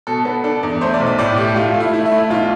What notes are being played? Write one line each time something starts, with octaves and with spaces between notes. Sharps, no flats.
B2 A4
B3
D4 A4
E2
A3 C5
D5
B1
D5
A2 D5
A3 G4
A3 F4
F4
A3
E4
A3 E4
E4
A3
E4
B1 F4